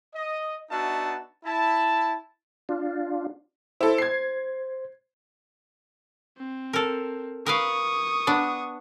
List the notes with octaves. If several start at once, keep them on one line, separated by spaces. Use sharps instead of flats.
D#5
B3 D4 D#4 F#4 E5 A5
E4 A5
D4 F4
E4 A4 C5
G#6 C7
C4
A4 A#4
A#4 B4 F5 C#6 D#6
B3 D4